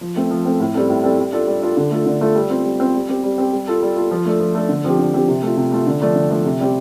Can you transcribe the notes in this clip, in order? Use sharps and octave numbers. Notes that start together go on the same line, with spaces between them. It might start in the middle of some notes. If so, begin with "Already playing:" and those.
F3
A3 C4 A4
F3
A3 C4 A4
A2
G3 C4 A4
A2
G3 C4 A4
G3
D4 F4 A4
G3
D4 F4 A4
D3
A3 F4 A4
D3
A3 F4 A4
G3
C4 F4
G3
C4 F4
G3
C4 G4
G3
C4 G4
G3
F4 A4
G3
F4 A4
F3
A3 D4 A4
F3
A3 D4 A4
D3
F3 C4 G4
D3
F3 C4 G4
C3
A3 F4
C3
A3 F4
D3
F3 A3 D4
D3
F3 A3 D4
C3
G3 C4 G4